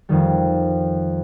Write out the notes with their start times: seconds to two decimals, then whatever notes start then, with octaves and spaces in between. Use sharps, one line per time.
0.09 F2 D#3 G3